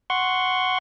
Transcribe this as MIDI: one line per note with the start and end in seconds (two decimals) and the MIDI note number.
0.10 0.78 78
0.10 0.78 84
0.10 0.78 85